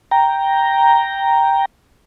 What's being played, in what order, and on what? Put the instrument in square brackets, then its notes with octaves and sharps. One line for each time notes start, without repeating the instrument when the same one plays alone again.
[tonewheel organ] G5 A#5